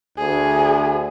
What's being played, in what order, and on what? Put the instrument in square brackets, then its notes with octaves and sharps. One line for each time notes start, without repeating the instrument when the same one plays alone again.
[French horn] D2 [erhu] G#4